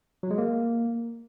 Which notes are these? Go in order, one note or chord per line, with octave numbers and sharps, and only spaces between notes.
F#3
G#3
A#3